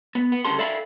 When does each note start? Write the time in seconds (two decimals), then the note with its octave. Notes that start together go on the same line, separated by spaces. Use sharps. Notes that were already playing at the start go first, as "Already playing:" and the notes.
0.15 B3
0.32 B3
0.45 D2 C#3 G3 A4 C6
0.58 A4 D5 E5 F5 B5